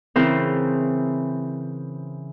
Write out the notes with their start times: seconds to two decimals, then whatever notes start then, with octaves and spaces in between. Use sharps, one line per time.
0.16 C#3 E3 C4 E4 A#4 C5